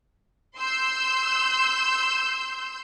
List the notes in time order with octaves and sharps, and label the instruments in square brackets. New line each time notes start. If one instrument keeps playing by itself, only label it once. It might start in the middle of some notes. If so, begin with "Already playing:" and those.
[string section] C6 E6 G6